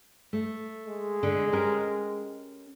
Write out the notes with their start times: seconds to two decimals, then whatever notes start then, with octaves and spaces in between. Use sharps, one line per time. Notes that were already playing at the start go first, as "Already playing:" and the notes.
0.33 A3
0.87 G#3
1.23 D3
1.52 C#4 G4 A#4